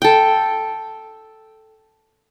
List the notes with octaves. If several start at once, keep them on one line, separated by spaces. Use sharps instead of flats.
A4 G5